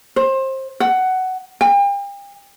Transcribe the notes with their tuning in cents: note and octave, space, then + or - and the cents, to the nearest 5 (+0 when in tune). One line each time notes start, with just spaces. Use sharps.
C5 +25
F#5 +10
G5 +40